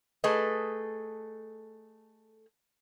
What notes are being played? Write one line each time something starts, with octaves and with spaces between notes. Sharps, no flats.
A3 G#4 A4 B4 D#5